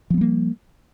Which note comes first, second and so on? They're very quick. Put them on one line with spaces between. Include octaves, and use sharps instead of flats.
F3 B3 G3 A#3